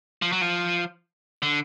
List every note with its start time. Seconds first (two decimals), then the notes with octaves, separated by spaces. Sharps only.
0.22 F3
0.32 F#3
0.41 F3
1.42 D3